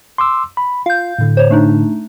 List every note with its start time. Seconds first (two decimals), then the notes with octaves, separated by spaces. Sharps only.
0.18 C6 D6 E6
0.57 B5
0.86 F4 F5 G6
1.19 A2 D3
1.37 C5 C#5
1.51 A3 D4 D#4